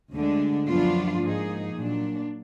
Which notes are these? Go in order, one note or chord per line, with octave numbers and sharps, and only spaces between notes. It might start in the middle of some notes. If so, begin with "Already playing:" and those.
D2 D3 G#3 D4
F#2 F3 B3 D4 F4
G#2 F3 A#3 D#4 G#4
A#2 F#3 D4